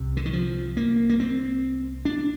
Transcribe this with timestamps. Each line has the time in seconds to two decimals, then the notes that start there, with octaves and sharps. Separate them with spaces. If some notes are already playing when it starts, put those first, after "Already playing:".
Already playing: C2 C3
0.17 D3
0.25 D#3
0.33 F3
0.77 A#3
1.09 A#3
1.20 C4
2.05 D4